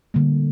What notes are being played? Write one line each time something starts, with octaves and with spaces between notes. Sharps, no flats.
D3 G3 A#3